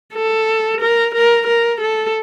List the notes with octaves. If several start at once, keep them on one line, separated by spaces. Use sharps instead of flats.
A4
A#4
A#4
A#4
A4